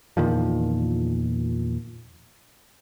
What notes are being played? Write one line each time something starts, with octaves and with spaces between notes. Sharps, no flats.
E2 A#2 D#3 F3